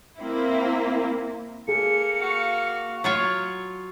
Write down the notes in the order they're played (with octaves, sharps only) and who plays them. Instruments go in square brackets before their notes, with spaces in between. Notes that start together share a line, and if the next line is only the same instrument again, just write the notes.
[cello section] A#3 C4 E4
[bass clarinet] A#3 [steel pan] G#4 A4 [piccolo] C#7
[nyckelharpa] F#4 F5
[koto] F#3 F4 C#5